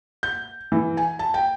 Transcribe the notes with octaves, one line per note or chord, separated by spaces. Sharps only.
G6
E3
G#5
A5
G5